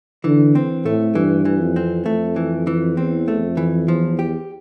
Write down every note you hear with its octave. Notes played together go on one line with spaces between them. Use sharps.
D3 E3
C4
A2 A3
G2 E3
E3
F2
C4
F2 A3
E3
E3
E2 C4
A3
F2
E3
E2 F3
G4